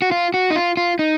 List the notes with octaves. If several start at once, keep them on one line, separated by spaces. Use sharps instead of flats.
F#4
F4
F#4
D#4
F4
F4
D#4